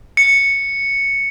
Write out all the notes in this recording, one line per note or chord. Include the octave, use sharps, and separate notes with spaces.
C#7